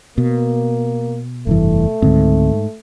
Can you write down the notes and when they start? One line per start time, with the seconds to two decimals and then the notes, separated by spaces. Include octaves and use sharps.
0.18 B2 A#3
1.47 F1 G2 E3 A3
2.02 C#2 G#2 D3 C4